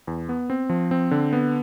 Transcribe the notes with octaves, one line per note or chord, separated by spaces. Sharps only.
E2
B3
C4
F3
C4
D3
B3